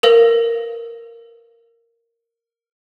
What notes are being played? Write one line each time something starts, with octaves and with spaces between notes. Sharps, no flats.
A#4 B4 F5